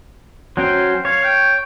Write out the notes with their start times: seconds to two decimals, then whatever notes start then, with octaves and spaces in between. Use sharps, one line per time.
0.57 F#3 C#4 C5 G5
1.05 C#5 F5
1.24 G5